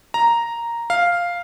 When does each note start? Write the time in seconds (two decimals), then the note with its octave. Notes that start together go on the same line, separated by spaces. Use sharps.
0.14 A#5
0.90 F5